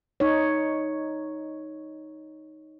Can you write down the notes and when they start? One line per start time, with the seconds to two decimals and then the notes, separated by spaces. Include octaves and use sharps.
0.20 D#4 C#5